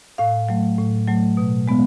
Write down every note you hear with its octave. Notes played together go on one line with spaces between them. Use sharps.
A2 F5
F#3 A3
A2
F#3 A3
B2
G#3 B3